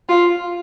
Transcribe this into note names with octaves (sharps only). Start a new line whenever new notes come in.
F4